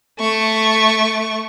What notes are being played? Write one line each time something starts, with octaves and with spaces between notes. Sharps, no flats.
A3 C#6